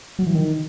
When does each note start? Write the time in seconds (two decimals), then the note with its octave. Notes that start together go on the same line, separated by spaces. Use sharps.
0.19 F#3
0.27 E3
0.34 D#3